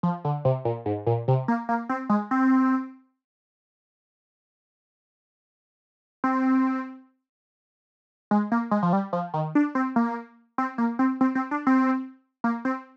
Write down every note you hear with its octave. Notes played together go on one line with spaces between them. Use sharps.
F3
D3
C3
A#2
G#2
A#2
C3
A#3
A#3
C4
G#3
C4
C4
G#3
A#3
G#3
F3
G3
F3
D#3
D4
C4
A#3
C4
A#3
C4
C4
C4
D4
C4
A#3
C4